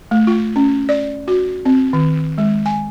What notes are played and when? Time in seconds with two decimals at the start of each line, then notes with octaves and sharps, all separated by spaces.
0.11 A3
0.27 F4
0.56 C#4
0.89 D5
1.28 F#4
1.65 C4
1.93 D#3
2.38 G#3
2.66 G#5